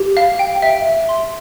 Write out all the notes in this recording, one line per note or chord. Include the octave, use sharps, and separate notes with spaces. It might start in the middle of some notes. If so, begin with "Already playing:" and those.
Already playing: G4
F5
G5
E5
E5
C6